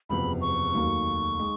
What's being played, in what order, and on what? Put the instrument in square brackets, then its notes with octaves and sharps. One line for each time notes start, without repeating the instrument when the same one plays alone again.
[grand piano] F#1 E2 C3 F3 [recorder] B5
[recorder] C#6
[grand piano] F1 D#2 D#3 F#3 A#3
D#3 G#3